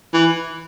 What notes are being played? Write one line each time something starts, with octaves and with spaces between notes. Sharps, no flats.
E3